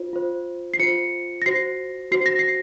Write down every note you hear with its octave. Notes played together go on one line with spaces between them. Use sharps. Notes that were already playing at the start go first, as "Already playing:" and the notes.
Already playing: F4 C5
F4 C5
C7
F4 C5 C#7
A#6
F#4 C5 C7
F#4 C5 C7
A#6
C7